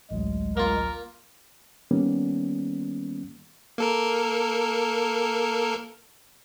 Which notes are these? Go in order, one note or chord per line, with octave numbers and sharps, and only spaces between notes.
A1 D2 F#3 G#3
A#3 F4 A#4
D#3 G3 A#3 B3 C#4
A#3 A4 A#4